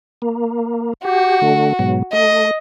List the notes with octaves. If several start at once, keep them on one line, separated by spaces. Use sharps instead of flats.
A#3
F#4 G4
D3 A3
G#2 B2 F#3
A3 D#5